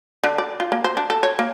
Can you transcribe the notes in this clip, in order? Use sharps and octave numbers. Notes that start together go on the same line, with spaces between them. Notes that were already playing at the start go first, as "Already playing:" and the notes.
D3
D5
F4
A#3
C5
D4
A4
C#5
A#3